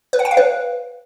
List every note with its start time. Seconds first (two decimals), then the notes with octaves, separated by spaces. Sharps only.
0.13 B4
0.19 F#5
0.25 G5
0.31 F5
0.37 B4